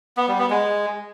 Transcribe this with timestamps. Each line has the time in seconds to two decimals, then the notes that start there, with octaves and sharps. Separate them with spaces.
0.17 B3
0.28 G3
0.39 B3
0.50 G#3